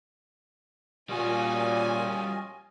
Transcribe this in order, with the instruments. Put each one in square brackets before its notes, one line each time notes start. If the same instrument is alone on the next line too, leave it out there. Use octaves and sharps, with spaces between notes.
[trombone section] A#2 [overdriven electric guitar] G3 F#4 [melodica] C#4 F4 D#5 [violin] G#5